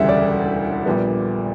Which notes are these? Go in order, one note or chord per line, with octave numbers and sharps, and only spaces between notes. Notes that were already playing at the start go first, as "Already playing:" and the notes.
Already playing: E1 D2 C#3 E3 G3 E5 F#5
D5
A#1 A#2 G3 B3